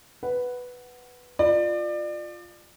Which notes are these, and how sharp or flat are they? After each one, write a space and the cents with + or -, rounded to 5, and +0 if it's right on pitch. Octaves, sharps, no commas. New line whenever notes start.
B4 +0 F#5 +0
F4 +0 D5 +30